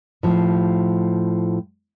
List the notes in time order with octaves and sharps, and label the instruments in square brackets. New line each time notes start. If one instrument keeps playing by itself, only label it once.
[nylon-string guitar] A2 F3